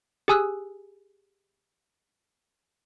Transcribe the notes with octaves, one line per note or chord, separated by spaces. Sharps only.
G4 G#4 G#5 D#6 E6 F#6